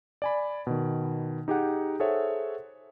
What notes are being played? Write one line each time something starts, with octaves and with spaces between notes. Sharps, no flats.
D5 G#5 B5
B2 D#3
D#4 G4 G#4 F#5
G#4 A4 C5 C#5 E5 F#5